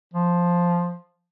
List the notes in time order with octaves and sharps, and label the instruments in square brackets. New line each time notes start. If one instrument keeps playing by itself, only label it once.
[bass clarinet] F3